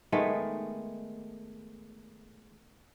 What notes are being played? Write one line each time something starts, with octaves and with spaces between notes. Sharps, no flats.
D#3 G#3 A3 B3